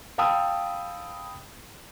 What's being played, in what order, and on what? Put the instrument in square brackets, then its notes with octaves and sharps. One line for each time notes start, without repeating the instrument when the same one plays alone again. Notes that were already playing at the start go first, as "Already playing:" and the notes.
[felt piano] F5 G5 A5 B5 D#6 E6